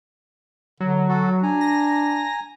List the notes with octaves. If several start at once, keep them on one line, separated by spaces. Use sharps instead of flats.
D3 F#3
F#4 A4
D4 G#5 A#5
A#6